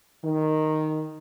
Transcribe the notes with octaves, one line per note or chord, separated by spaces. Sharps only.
D#3